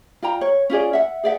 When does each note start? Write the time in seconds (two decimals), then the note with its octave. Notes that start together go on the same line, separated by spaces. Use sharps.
0.22 F4 D5 G5 A#5
0.41 C#5
0.70 C#4 F4 G#4 D5
0.93 E5 F#5
1.24 G#4 D5 E5 F#5